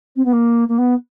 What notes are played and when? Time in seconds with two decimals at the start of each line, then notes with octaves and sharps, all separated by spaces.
0.16 C4
0.25 B3
0.33 A#3
0.69 A#3
0.78 B3